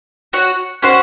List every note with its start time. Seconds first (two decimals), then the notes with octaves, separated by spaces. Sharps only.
0.33 F#4 C#5 F#5
0.82 C#4 F#4 C5 F#5